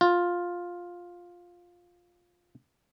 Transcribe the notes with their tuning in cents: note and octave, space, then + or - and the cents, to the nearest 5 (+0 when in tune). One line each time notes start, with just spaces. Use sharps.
F4 +10